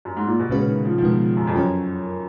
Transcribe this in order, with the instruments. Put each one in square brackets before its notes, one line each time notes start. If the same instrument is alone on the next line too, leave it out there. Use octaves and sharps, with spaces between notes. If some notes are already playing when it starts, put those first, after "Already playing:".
[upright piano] F#2
G#2
A#2
B2
[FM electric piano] A#2 G#3 C#4 F#4 B4 [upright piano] C#3
[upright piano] D#3
F3
F3
[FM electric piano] B2 G#3 B3 F4 [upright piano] D#3
[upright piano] F#2
F2
[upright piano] F#2 [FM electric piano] F#3 C#4 F#4 A#4 C#5